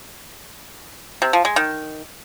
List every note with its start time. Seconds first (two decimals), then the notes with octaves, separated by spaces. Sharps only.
1.22 C3
1.33 F3
1.45 G#3
1.56 D#3